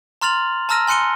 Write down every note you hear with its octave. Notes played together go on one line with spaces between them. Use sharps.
A#5 C6 F6 A6 F7 F#7
A5 A#5 E6 F6 A#6 D#7
G#5 C6 F#6 C#7 D#7 G7